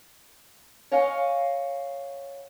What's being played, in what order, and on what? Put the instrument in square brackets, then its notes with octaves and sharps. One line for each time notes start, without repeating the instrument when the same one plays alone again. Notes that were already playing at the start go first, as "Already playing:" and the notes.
[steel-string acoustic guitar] C#5 D#5 F5 F#5 G#5